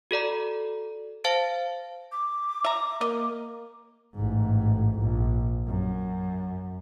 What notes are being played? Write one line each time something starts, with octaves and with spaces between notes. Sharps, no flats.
F#4 A4 D5 A#5
C5 F5 A5 A6 D7
D6
E5 A#5
A#3 D#5
A1 G#2
A#1
F#2